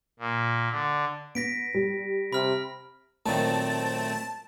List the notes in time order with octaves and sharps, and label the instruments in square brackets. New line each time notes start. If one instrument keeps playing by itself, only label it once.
[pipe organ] A#2
D3
[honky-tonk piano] B3 [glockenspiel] A#6 B6 D7
[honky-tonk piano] G3
[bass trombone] C3 [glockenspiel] B5 F6
[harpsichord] F#2 A#2 D#3 [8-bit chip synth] A3 C4 C5 [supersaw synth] A5